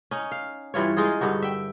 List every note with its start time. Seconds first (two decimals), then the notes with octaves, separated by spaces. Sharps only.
0.11 C#4 D#4
0.31 F5
0.74 G2 E3 F4 C#5
0.97 G#3 D#4 F4 G#4
1.21 G2 D3 D#4 F#4
1.42 E5 G5